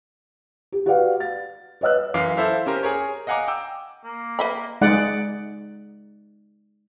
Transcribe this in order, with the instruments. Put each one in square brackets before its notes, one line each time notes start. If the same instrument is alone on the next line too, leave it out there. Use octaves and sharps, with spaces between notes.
[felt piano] G4
F#4 G4 B4 D5 F5 F#5
A6
B4 C#5 D#5 E6 F#6
[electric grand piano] F#2 E3 F5 D6 C7
E4 A4 C5 E5 F5
C#4 G4 A#4 C5
G#4 A#4 C#5
D#5 F5 F#5 G#5 A#5 D6
G5 D6 E6
[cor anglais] A#3
[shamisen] B4 E5 B5
[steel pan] G#3 D#4 D5 F#5